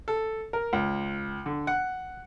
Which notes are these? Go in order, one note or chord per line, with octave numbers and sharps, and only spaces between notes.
A4
A#4
C#2
D3
F#5